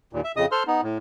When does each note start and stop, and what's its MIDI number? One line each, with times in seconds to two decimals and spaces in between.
0.13 0.21 39
0.13 0.21 46
0.24 0.32 76
0.36 0.46 41
0.36 0.46 49
0.36 0.46 75
0.36 0.46 87
0.52 0.63 69
0.52 0.63 72
0.52 0.63 84
0.52 0.63 89
0.67 0.81 59
0.67 0.81 63
0.83 0.98 45